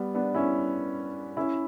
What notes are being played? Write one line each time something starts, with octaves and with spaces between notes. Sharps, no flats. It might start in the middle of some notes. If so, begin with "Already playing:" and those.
Already playing: G3 B3
B3 D4
C#4 E4
C#4 E4